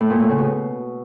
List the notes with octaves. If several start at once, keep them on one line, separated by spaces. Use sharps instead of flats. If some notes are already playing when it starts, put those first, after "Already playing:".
A2
A#2
A2
C#3
B2